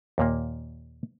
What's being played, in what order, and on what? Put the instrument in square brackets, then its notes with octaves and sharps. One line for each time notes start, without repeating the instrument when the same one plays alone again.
[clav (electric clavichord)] D#2 A#2 A#3